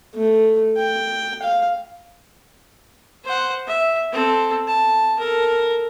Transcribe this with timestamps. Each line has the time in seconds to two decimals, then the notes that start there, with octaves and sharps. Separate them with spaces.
0.15 A3
0.78 G5
1.43 F5
3.24 C5 F#5
3.67 E5
4.12 C4 A4
4.67 A5
5.19 A4 A#4